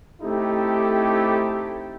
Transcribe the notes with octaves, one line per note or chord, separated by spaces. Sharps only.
A3 C4 D#4 E4 G4 A4